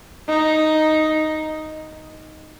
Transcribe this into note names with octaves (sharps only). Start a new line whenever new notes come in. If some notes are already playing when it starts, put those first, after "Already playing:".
D#4